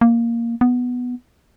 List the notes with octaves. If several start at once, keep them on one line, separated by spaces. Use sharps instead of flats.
A#3
B3